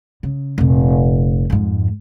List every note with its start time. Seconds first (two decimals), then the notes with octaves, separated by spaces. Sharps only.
0.23 C#3
0.58 F1 A#2
1.50 F2 G#2